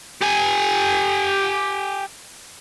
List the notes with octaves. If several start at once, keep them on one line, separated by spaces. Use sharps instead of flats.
G4 G#5